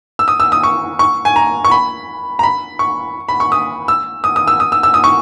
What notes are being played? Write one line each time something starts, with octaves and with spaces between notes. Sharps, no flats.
E6
D#6
E6
D#6
C#6
C#6
G#5
A#5
C#6
B5
A#5
B5
C#6
B5
C#6
D#6
E6
D#6
D#6
E6
D#6
E6
E6
D#6
C#6